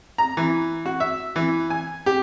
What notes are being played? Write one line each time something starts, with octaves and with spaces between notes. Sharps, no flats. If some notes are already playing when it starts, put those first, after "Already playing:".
A#5
E3
F#4
E5
E3
G#5
G4